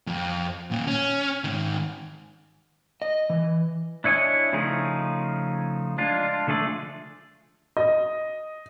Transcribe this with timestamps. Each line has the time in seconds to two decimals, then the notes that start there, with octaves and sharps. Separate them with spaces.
0.07 F2
0.71 D#2 A#2
0.87 C#4
1.44 G#2 D#3
3.02 D#5
3.30 E3
4.04 D4 E4 C#5 D#5 G#5
4.53 C#3 F3 A3 D#4 G#4
5.98 G#3 D4 F4
6.47 D3 F3 A3 G#4 D5
7.77 D#5